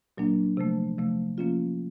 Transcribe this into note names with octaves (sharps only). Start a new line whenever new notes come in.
A#2 F#3 A#3 D4
C3 F3 A3
C3 F3 A3
F3 A#3 C#4 F4